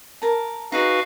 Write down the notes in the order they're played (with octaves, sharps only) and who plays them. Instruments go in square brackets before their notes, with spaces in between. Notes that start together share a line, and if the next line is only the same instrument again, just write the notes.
[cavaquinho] A#4 A5
[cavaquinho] D#4 G#4 [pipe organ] F#4 B4 F5